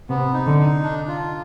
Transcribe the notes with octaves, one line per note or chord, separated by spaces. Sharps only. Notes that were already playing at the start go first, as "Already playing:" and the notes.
C3 B3
D#4
D3
D#4
D4
F4